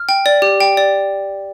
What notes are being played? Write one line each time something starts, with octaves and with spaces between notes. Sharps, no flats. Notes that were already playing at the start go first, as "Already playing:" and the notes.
Already playing: F6
G5
D5
G4
G5
D5